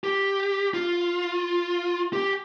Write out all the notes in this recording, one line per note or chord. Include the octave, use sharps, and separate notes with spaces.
G4
F4
G4